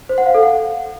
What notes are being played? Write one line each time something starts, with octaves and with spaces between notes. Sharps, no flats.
C5
F#5
F5
A4
F#5